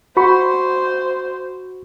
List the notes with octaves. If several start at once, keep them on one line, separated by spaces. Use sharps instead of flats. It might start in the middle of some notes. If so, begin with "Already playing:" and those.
F#4 C5 B5 C#6